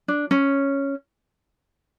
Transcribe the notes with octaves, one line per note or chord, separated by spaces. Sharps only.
D4
C#4